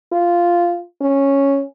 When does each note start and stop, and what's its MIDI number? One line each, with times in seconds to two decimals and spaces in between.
0.12 0.80 65
1.01 1.63 61